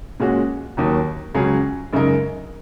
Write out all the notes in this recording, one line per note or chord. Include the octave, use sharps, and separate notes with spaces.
A#2 G#3 C#4 F#4
D#2 D#3 F#3
C#2 C#3 F#3 C#4 G#4
F#2 C#3 G#3 D#4 A#4